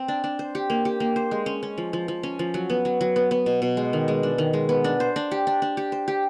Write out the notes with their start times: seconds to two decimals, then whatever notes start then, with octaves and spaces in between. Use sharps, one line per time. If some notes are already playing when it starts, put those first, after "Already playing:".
Already playing: C4
0.08 D4
0.24 D4
0.39 C5
0.55 G4
0.70 A#3
0.85 G4
1.00 A#3
1.16 C5
1.31 G#3
1.46 C#4
1.63 C#4
1.78 F3
1.93 F3
2.08 F3
2.23 C#4
2.39 F3
2.54 F#3
2.70 B3
2.85 F#3
3.01 F#3
3.16 B3
3.31 B3
3.46 B2
3.62 B2
3.77 G#3
3.93 D#3
4.08 G#3
4.23 D4
4.38 D#3
4.53 G#3
4.69 B3
4.84 D4
5.00 C5
5.16 D4
5.31 G4
5.47 D4
5.62 D4
5.77 G4
5.92 C5
6.08 G4